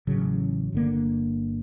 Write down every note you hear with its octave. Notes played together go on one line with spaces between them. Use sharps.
A1 C#3 F#3
G1 D3 A#3